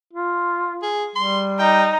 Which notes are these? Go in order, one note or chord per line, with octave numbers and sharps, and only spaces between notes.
F4
G#4
G3 C6
D#4 G5